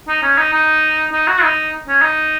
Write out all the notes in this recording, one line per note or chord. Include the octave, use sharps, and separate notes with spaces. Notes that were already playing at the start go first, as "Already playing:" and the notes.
D#4
C#4
D#4
D#4
D#4
F#4
D#4
C#4
D#4